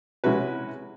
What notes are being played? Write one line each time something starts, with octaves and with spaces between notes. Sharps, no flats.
C3 G#3 C#4 E4 F#4 B4